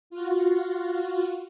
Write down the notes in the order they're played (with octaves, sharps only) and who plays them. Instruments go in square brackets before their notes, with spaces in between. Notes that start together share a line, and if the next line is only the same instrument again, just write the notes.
[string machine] F4 F#4